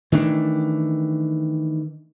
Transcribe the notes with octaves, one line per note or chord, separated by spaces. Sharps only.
D#3 E3 A3 D4